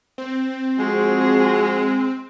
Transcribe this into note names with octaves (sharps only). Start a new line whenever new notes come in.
C4
F3 G#3 F#4 G#4